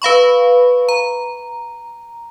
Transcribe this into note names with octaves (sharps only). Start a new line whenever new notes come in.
B4 F5 B5 C#6
A#5